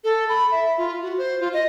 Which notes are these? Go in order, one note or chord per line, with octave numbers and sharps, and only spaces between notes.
A4
B5
E5
F4
F#4
C5
F4
D#5